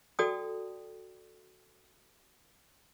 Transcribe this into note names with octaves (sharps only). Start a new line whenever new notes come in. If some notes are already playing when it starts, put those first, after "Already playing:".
F#4 A4 D5 G5 A5 D#6